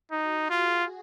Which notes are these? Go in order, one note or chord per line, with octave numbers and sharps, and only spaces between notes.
D#4 F#4
F4 G#4